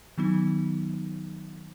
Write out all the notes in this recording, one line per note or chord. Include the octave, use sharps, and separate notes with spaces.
D#3 F#3 B3 D#4